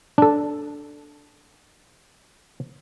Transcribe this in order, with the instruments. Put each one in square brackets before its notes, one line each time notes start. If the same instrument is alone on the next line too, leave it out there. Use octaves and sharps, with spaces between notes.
[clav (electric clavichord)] D4 A4